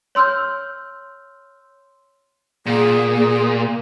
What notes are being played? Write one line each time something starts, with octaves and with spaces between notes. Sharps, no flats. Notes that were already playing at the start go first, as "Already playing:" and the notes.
C#5 C6 E6 F6 G6
A#2 G#4